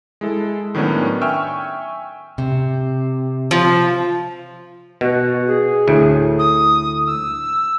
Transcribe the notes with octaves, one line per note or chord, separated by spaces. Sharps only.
G#3 E4 A4
A2 D#3 F#3 B3 C#4 D4
E5 G5 G#5 C#6 E6 F6
C3
F3
B2 F#4
G#4
D2 A2
D#6
E6